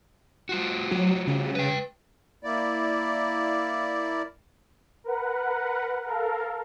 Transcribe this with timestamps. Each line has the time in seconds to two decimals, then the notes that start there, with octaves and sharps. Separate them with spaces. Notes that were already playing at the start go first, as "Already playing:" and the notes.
0.49 G3 F4 F#4
0.91 F#3
1.27 C#3
1.55 B4 G5
2.43 A#3 E4 D5
5.04 A#4 B4 F#5
6.06 A4 A#4 F5